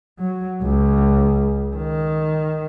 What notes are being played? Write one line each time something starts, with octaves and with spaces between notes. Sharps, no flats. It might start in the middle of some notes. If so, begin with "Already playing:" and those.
F#3
C#2
D#3